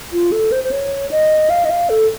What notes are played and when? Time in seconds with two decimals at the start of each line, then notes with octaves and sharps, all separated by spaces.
0.13 F4
0.32 A4
0.52 C5
0.64 C5
0.71 C#5
1.11 D#5
1.50 F5
1.65 D#5
1.70 F5
1.90 A4